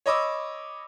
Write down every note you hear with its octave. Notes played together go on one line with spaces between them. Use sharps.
C#5 D#5 B5 D6 E6